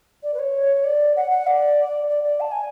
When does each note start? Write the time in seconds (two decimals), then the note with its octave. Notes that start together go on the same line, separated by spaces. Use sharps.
0.23 D5
0.33 B4
0.38 C#5
0.84 D5
1.16 F#5
1.30 F#5
1.46 D5
2.09 D5
2.23 D5
2.40 A5
2.51 G#5